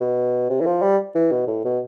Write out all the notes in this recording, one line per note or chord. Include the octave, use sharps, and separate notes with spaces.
B2
C3
E3
F3
G3
E3
B2
A2
B2